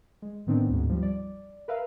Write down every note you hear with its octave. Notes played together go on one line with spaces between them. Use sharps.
G#3
A2 D#3 B3 C4 D4
D2 G#2
F3 G3
D5
A#4 B4 E5 F5